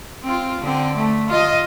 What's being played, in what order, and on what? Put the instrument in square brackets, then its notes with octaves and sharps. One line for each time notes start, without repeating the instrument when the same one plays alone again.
[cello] C4 F4
D3 C4
A3
F4 D#5